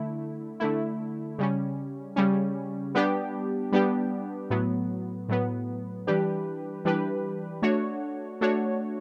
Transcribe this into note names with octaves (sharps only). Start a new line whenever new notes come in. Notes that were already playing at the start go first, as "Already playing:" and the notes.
Already playing: D3 A3 E4
D3 A3 E4
C#3 G3 C#4
C#3 G3 C#4
G3 B3 D4 G4
G3 B3 D4 G4
A2 F#3 B3
A2 F#3 B3
E3 G3 D4 G4 B4
E3 G3 D4 G4 B4
A3 D4 F#4 C#5
A3 D4 F#4 C#5